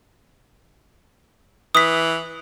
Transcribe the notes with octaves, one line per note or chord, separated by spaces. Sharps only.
E3 D#6 B6